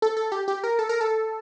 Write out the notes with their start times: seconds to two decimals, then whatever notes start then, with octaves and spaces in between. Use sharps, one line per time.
0.02 A4
0.17 A4
0.32 G4
0.48 G4
0.64 A#4
0.79 A4
0.89 A#4
1.01 A4